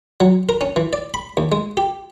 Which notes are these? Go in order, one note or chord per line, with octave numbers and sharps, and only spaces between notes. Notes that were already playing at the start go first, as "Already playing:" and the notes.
F#3
A#4
C#4
E3
D5
B5
D#2
G#3
G4